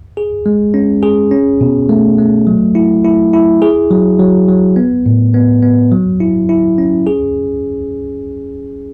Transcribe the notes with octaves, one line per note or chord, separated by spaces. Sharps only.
G#4
G#3
C#4
G#4
C#4
B2
A3
A3
F#3
E4
E4
E4
G#4
F#3
F#3
F#3
B3
A2
B3
B3
F#3
E4
E4
C#4
G#4